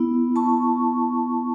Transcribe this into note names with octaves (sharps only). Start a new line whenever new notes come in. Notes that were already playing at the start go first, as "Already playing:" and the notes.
Already playing: B3 E4
A5 C#6